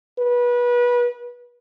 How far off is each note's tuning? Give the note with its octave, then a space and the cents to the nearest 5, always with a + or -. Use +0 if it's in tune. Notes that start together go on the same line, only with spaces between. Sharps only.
B4 -25